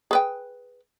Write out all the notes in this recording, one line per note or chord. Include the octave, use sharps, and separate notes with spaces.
G#4 B4 G5